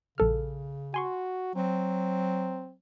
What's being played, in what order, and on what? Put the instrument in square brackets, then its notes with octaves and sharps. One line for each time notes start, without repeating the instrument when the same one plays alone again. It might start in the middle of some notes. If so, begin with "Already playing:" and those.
[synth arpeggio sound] A#1 A4 F6 [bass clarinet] C#3
[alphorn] F#4 [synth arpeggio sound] G#5 C6 C#6
[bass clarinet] F#3 [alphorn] C4